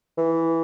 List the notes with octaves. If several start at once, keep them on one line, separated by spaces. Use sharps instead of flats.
E3